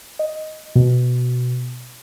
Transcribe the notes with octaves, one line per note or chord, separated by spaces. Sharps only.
D#5
B2